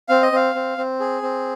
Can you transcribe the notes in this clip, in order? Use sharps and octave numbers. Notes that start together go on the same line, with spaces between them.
C4 F5
D#5
C4 F5
C4
C4
G#4
C4